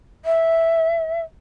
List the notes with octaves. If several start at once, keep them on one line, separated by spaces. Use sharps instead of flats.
E5